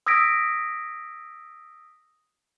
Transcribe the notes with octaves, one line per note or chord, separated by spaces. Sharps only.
D#6 E6 G#6 A#6 B6 D7